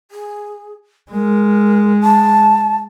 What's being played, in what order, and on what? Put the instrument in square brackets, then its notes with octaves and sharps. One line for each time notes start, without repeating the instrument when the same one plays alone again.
[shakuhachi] G#4
[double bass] G#3 [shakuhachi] A#4
[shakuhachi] A5